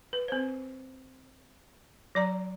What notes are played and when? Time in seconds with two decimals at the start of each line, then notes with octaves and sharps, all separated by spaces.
0.13 B4
0.28 C4 C5
2.15 F#3 D5 A#5